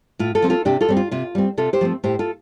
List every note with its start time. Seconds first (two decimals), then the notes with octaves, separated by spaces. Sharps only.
0.19 A2 F4
0.35 F4 A4
0.42 F3 C4
0.50 F4 A4
0.65 C3 D4 G4
0.81 F4 A4
0.89 G3 C4
0.97 F4
1.11 C3 F4
1.35 G3 C4
1.57 C3 F4 A4
1.73 G4 C5
1.81 F3 A3 C4
2.04 A2 G4 C5
2.19 F4 A4